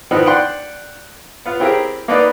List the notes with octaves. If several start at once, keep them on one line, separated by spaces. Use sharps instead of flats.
D#3 F3 B3 C4 D#4 E4
D4 F#5 G5 C6
B3 F4
C4 E4 G4 G#4 A#4
A#3 B3 D4 D#4 B4 D5